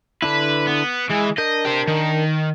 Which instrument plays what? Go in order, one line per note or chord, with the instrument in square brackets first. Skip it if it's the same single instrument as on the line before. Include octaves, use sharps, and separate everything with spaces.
[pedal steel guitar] D3 D4 E4 [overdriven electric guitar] B4
[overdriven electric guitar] B3
[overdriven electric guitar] E3 [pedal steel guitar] G#3
[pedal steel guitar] D4 A#4 G6 [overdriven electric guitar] D#5
[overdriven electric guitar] G4 C5
D#3